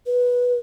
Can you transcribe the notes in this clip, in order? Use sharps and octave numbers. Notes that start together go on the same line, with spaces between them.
B4